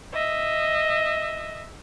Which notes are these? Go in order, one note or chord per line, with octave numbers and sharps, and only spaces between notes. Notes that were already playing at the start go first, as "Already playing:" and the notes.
D#5 E5